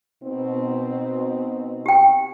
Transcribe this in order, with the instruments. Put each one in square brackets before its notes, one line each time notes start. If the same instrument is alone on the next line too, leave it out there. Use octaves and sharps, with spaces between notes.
[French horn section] B2 C4 D#4
[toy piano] G4 G5